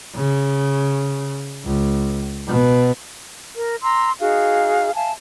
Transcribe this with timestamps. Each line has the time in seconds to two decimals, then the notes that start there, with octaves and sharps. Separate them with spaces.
0.15 C#3
1.64 C#2
2.47 B2
3.57 A#4
3.83 A#5 C6 E6
4.20 D#4 F#4 G#4 F5
4.94 E5 F5 G#5 A5